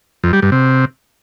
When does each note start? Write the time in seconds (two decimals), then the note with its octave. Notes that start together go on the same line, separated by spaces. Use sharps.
0.24 F2
0.33 G3
0.42 G2
0.52 C3